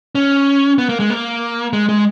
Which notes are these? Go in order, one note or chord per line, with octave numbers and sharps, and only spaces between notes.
C#4
B3
A#3
G#3
A#3
G#3
G#3